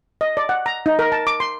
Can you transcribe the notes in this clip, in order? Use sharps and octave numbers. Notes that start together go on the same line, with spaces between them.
D#5
D5
F#5
A#5
D#4
A#4
A5
D6
C6